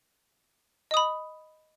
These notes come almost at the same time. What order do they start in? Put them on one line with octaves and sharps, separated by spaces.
D#5 D#6 B5